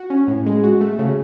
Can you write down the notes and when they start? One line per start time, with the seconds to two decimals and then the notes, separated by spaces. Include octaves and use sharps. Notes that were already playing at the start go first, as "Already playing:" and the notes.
Already playing: F#4
0.10 C#4
0.27 A2
0.46 G#3
0.64 F#4
0.81 A3
0.99 C#3